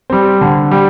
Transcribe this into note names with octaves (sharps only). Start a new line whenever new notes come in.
G3 C4
D3
G3